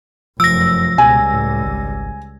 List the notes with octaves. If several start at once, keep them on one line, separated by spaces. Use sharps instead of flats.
F1 F#2 F3 E6 A#6
C#2 B2 G3 G#5
A2
G#1